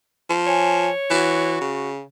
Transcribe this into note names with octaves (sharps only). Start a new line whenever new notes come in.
F3
C#5 G#5
E3 F#4
C#3